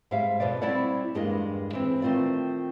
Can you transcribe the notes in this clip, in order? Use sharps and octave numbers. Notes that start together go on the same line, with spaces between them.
G#2 G3 E5 F5
F2 B2 F3 B3 D5
G3 C4 E4 C#5 D5 F#5
E2 G2 G#3 A#3 D4 D#5
E3 C4
D#3 A3 C4 F4 D5